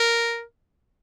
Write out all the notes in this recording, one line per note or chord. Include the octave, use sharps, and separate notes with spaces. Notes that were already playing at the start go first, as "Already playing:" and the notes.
Already playing: A#4